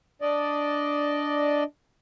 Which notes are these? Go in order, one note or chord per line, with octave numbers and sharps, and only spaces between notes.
D4 D5 D#5